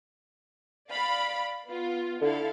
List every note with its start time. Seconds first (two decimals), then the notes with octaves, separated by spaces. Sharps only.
0.90 D5 F5 B5
1.68 B3 F4
2.21 D3 E4 A4 F5